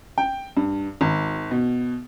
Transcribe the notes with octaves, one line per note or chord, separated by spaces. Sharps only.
G5
G2
G#1
B2